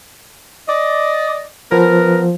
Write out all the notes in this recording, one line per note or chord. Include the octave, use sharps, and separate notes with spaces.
D5 D#5
F3 B3 A#4